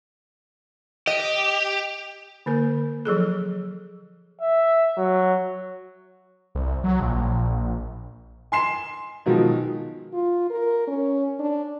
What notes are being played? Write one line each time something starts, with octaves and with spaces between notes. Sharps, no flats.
G4 D#5
D3 A#3 A#4
F3 F#3 G#4 A4
E5
F#3
C2
F#3
A#1
G#5 C6 C7 E7
B2 D#3 F3 F#3 G#3
F4
A#4
C#4
D4